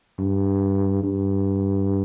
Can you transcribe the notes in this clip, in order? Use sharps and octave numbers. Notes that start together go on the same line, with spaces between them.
G2
G2